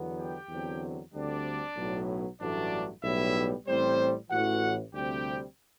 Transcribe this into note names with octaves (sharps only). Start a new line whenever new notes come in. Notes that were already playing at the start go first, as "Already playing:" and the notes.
Already playing: E2 D3 F#3 B3
G4 G5
E2 D3 F#3 C4
D2 D3 G3 C4 D4 D5
B1 A2 F#3 B3
A1 G2 F#3 A3 D4 D5
B1 A2 G3 B3 E4 E5
A1 A2 G3 C4 C5
A1 A2 E3 F#4 F#5
D2 C3 G3 C4 G4 G5